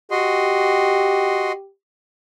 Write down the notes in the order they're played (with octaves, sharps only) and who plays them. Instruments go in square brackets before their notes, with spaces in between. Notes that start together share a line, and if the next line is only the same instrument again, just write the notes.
[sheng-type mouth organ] F#4 D#5 C6 [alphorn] G4